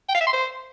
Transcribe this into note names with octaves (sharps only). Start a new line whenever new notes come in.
G5
F5
E5
C6
C5